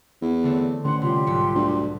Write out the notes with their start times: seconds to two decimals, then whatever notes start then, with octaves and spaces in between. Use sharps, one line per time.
0.22 E2
0.43 D3 A3 C4
0.84 A1 D3 F#5 C6
1.02 C3 G3 F4 G4 C6
1.26 B1 G#2 C#7
1.55 D2